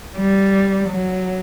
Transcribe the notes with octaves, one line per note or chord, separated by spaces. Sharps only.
G3
F#3